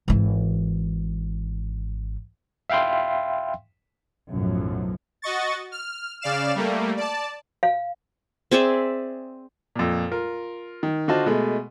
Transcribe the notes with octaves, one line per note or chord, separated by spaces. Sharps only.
G#1 E3
E5 F5 G5 B5 C6
B1 F#2 A2 F3 F#3
F#4 D#5 C#6 A6
F6
C#3 D5 F5 F6 E7
G3 A3 A#3
D5 A5
F5
C4 G#4 D5 E5
F2 A#2
F4 A#4
D#3
D3 F4 F#4 C5 D#5 A5
B2 G#3 A3